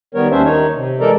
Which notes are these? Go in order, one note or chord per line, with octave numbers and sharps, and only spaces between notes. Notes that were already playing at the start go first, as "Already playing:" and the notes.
D#3 G3 B3 A#4 C#5
D#2 G3 C#4 D4 C5 E5
D#3 D#4 C#5
C3
E3 G#3 A4 A#4 D5 A#5